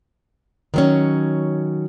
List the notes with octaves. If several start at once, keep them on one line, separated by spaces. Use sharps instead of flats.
D#3 F#3 C#4